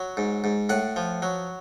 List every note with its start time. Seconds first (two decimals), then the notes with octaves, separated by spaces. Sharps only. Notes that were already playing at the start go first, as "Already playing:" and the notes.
Already playing: F#3
0.17 G#2
0.44 G#2
0.69 A2 F#5
0.96 F3
1.22 F#3